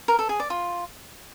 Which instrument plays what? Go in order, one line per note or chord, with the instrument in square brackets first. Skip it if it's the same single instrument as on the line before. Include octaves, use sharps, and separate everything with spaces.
[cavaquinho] A#4
A4
G#4
D5
F4